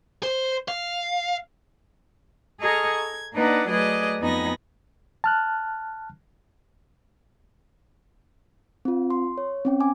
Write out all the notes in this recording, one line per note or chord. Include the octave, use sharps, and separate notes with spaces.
C5
F5
G#4 A4 D#5 A#5 C#6 F6
G#6
A#3 D4 D#4 B4 D5 F#5
F#3 A3 G#4 B4 D5 D#5
F2 B3 D#4 G#5 B5 A#6
A5 F6 F#6
C4 F4
C6
C#5
C4 C#4 G5
G#5 D6